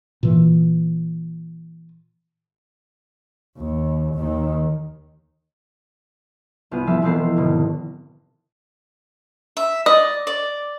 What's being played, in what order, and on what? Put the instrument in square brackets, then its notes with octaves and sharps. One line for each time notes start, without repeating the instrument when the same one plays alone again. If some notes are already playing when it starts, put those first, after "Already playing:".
[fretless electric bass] A#2 E3
[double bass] D#2
D#2 D#3
[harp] C2 B3 F4 D#7
F3 G3 B3 A4 E5 F5
E1 B3 C4 A4 C7
G#1 B2 D3
[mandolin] E5
[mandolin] D5 [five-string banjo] D#5
[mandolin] D5